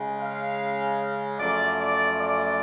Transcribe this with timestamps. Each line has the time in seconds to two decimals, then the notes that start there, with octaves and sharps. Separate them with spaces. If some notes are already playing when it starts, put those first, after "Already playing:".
Already playing: C#3 G#3
0.19 F5
1.40 F#2 F3 A3 D5
1.80 D5
2.20 D5